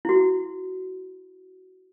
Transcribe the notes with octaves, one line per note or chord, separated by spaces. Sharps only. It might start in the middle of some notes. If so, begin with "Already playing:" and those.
E4 F#4